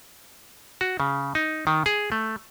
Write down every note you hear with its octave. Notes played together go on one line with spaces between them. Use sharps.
F#4
C#3
D#4
D#3
G#4
A3